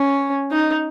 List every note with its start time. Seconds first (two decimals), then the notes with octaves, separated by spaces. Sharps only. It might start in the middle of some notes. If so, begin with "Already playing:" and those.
Already playing: C#4
0.51 D#4